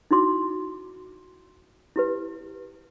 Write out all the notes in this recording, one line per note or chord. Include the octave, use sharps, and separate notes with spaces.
D#4 E4 F#4 C6 D6
E4 G4 B4